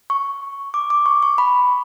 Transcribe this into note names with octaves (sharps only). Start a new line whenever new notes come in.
C#6
D6
D6
C#6
C#6
B5